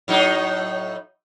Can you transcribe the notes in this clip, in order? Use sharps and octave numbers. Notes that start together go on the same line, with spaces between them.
A2 F#3 D#4